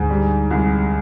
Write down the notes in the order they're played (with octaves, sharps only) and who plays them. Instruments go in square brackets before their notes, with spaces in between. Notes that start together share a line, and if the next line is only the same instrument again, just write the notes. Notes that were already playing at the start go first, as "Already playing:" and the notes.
Already playing: [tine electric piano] D2 D3 [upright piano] G#2
[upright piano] G3
C2